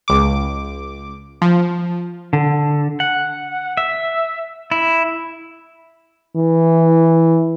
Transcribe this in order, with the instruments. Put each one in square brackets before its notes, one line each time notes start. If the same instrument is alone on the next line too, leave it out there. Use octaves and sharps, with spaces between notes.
[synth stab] C#2 D6
F3
[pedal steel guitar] D3
F#5
E5
E4
[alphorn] E3